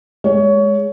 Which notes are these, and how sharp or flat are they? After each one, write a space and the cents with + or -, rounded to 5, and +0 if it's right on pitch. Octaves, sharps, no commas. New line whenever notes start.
G#3 +0 C#5 +20